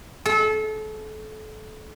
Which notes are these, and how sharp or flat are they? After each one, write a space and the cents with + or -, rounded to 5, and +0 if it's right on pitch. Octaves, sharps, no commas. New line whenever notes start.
A4 -30